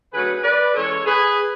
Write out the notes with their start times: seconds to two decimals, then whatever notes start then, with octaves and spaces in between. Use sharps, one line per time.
0.12 D3 F#3 A3 C#4 G#4 B4
0.43 B4 D5
0.74 E3 G#3 C#4 A4 C#5
1.05 G#4 B4